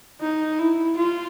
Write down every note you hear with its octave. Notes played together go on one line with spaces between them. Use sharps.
D#4
E4
F4